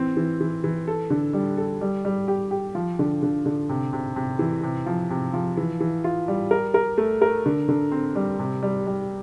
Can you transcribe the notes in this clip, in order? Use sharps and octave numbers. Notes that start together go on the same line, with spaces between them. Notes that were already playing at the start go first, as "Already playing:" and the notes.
Already playing: E3 C4
E3
E3
E3
A4
D3
G3
A4
G3
G3
G4
G4
F3
D3
D3
D3
C3
C3
C3
E3
C3
F3
C3
F3
E3
E3
F4
G3
A#4
A#4
A3
A#4
D3
D3
C4
G3
C3
G3
G3